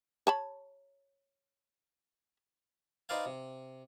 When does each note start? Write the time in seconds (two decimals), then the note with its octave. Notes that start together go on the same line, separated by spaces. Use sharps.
0.27 C#5 A5 B5
3.09 D#4 B4 C5 D5 F5 G#5
3.26 C3